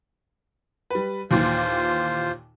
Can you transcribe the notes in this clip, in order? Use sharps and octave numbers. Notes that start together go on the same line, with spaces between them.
G3 B4
D#2 A#2 E3 F4 C5